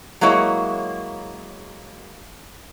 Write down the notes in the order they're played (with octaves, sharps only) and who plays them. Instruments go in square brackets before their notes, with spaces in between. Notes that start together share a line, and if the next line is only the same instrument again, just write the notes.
[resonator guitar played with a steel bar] F#3 G#3 A#3 E4 C#5